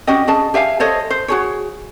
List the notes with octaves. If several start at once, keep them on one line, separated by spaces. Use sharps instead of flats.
C#4 F#4 G4 D#5
C#4 G#4 D#5 A5
G4 E5 F5 G#5
A4 C5 C#5 D#5
C5
F#4 G#4 C#5